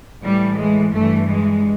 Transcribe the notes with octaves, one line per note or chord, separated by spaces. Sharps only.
A2 E3 G3
G#3
G2 E3 A3
G#3